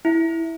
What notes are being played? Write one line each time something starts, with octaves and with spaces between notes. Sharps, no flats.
E4